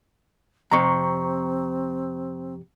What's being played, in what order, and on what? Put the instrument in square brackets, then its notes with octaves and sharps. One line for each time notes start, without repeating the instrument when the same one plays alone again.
[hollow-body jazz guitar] F2 C3 [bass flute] C4 [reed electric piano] A#5 C#6